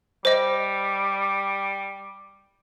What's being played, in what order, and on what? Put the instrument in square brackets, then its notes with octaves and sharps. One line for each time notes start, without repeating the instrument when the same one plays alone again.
[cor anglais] G3 [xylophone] C5 D#5